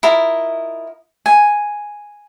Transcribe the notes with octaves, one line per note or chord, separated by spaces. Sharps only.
E4 F4 A#4 D#5
G#5